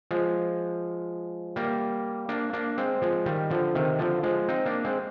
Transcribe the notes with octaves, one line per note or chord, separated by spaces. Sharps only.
F3 G#3
G3 A#3
A#3 D4
A#3 D4
G#3 C4
F3 G#3
D#3 G3
D3 F3
C3 D#3
D3 F3
F3 G#3
C4 D#4
A#3 D4
G#3 C4